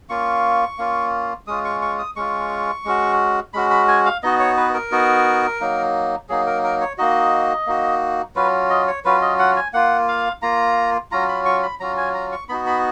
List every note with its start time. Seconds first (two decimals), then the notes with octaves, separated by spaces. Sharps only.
0.09 A#3 C#4 F4 C#6
0.78 A#3 C#4 F4
1.47 G#3 C#4 F4 D#6
1.65 C#6
1.82 C#6
1.99 D#6
2.16 G#3 C#4 F4 C#6
2.85 G#3 C#4 F#4
3.54 G#3 C#4 F#4 B5
3.70 B5
3.88 G#5
4.05 F5
4.23 B3 D#4 F#4 D#5
4.40 C#5
4.57 B4
4.74 A#4
4.92 B3 D#4 F#4
5.60 F#3 A#3 D#4
6.29 F#3 A#3 D#4 G#4
6.46 A#4
6.63 A#4
6.81 C#5
6.98 A#3 D#4 F#4 D#5
7.67 A#3 D#4 F#4
8.35 F#3 C#4 F4 B4
8.70 D#5
8.87 C#5
9.05 F#3 C#4 F4 B4
9.22 D#5
9.39 F#5
9.56 G#5
9.73 A#3 F4 F#5
10.08 F5
10.42 A#3 F4 A#5
11.11 F#3 C#4 F4 A#5
11.28 B5
11.45 C#6
11.63 B5
11.80 F#3 C#4 F4 A#5
11.97 G#5
12.14 A#5
12.32 C#6
12.49 B3 D#4 F#4 B5
12.66 B5